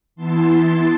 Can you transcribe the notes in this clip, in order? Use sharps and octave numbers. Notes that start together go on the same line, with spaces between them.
E3 B3 E4 A5 C6